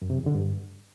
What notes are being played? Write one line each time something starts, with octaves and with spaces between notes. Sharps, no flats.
F#2
C3
E2
D3
G2